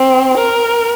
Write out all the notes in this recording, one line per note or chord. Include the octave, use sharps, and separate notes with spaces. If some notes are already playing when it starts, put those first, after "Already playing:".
Already playing: C4
A#4